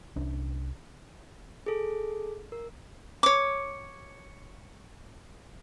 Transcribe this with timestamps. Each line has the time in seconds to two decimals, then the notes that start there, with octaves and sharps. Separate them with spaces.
0.16 C2 C#4 D4
1.66 G#4 A4
2.52 A#4
3.23 C#5 D6